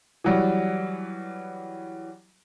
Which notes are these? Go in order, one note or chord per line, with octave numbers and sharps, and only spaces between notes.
E3 F#3 G3